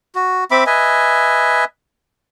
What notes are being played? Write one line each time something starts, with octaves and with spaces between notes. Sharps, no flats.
F#4
C4 E5 B5 D6
B4 D#5 E5 G#5